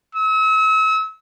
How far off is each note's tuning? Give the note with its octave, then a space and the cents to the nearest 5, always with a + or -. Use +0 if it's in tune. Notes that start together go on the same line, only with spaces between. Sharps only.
E6 -40